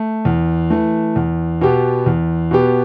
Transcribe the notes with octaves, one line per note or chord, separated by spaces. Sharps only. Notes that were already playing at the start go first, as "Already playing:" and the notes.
Already playing: A3
E2
E3 A3
E2
B2 B3 G4
E2
B2 B3 G4